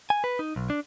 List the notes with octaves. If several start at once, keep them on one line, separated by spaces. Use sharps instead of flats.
G#5
B4
D#4
B1
D4